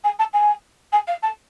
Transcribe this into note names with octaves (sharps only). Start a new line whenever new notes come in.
G#5
A5
G#5
G#5
F5
A5